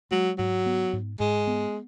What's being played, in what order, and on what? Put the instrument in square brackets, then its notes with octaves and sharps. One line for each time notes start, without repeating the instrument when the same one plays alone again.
[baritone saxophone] F#3 [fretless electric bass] G#3
[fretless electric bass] G#2 [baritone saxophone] F#3
[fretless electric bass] B3
G#2
[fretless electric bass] G#2 [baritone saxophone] G#3
[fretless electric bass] B3